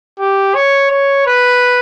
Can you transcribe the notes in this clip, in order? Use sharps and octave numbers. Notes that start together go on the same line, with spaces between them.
G4
C#5
C#5
B4